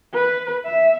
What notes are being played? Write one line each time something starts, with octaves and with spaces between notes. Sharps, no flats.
B4
E5